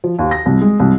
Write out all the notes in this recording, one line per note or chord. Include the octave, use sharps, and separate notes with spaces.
F3
D#2
A#6
C2
G#3
C2